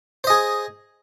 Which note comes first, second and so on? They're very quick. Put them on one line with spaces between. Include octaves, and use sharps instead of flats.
C5 D#5 G#4